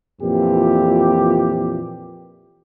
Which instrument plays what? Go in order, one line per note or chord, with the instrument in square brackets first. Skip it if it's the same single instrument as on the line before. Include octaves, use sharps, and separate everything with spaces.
[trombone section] F2 A#2 E3 G4